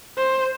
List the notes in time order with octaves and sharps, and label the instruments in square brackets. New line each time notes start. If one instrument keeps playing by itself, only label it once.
[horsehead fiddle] C5